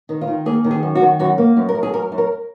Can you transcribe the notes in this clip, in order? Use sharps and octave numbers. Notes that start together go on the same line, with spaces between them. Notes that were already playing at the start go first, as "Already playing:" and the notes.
D#3
F4
D#3
A#3 G#4
D#3
G#4
F#2
F#4
D#3
F#2 F#4
A#3
F#2
A#4
F#2
G#4
F#2 A#4
F#2
A#4